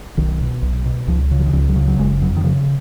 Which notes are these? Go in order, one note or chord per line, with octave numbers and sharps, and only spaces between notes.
B1 D#3
B2
B1
B2
C#2 F3
C#3
F3
D#3
C#2 F3
F#3
C#3
F#3
F#1 G#3
F2 F#3
D#3
C#3 F3